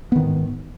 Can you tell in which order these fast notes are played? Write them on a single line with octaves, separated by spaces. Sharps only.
B3 D#3 G#2